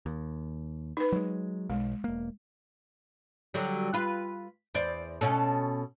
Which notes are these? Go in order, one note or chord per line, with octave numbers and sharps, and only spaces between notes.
D#2
D#4 B4
F#3 G#3
B1 G#3
E1 A#3
D3 F#3 G3
F4 B4
E2 C5 D5
B2 C#4 A4